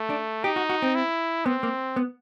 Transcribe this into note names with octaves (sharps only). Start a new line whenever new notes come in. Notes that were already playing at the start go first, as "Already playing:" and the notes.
Already playing: A3
D4
D#4 G4
F#4
F#4
C4
E4
B3 C4
A#3
B3